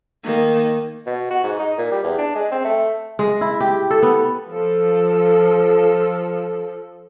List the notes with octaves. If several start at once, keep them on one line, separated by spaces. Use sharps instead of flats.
D#3 A#3
B2
F#4
G#2
D#4
A#2
G3
E2
D4
G#3
C4
A3
G#3
E4
G4
A4
B3
F3 A4